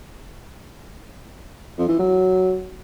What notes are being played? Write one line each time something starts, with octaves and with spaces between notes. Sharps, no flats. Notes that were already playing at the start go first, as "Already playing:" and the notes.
F2
E3
F#3